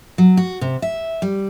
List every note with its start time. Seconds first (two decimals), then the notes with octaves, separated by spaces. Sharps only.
0.18 F#3
0.37 F#4
0.61 C3
0.82 E5
1.22 G3